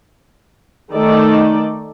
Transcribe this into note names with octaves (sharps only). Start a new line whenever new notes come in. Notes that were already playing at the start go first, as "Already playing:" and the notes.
D#3 A3 D#4 A4 D5